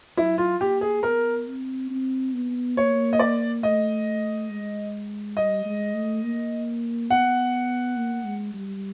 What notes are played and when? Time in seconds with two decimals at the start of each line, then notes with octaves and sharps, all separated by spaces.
0.17 F#3 E4
0.38 F4
0.60 A#3 G4
0.81 G#4
1.03 B3 A#4
1.47 C4
1.90 C4
2.34 B3
2.77 A#3 C#5
3.13 D#5
3.19 D5
3.63 A3 D#5
4.50 G#3
5.37 G3 D#5
5.65 G#3
5.94 A3
6.23 A#3
7.10 B3 F#5
7.97 A#3
8.25 G#3
8.54 G3